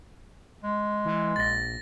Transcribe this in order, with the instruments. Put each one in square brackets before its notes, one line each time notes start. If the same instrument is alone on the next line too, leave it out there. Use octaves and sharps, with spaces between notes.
[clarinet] G#3
[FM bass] E3
[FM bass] A#1 [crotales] A6 A#6